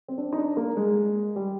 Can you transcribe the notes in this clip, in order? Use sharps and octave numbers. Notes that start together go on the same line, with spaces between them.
C4
D4
D#4
D4
A#3
G#3
G3